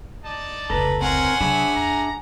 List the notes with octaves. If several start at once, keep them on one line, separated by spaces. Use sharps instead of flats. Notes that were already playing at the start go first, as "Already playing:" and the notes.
D#4 D5 A5
F1 C#2 A4 B4 A#5
C4 E4 A#4 C#5 F#5 G#5 C6
C3 F#3 C4 D4 G#4 C#5 E5 B5
F2 A#5